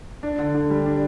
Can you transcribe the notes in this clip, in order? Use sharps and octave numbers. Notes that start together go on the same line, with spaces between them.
D4
D3
D3
G3
D4